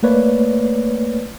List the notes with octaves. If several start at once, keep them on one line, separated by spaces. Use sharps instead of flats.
A3 A#3 B4 C#5 D5